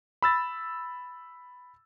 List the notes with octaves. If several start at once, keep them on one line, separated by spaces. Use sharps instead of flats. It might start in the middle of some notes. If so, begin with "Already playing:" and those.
B5 E6 A6